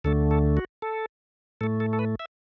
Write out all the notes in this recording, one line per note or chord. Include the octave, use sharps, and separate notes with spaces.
D2 D3 A3 A4
A4
F#4
A4
A2 A3 A4
A4
A4
B4
E5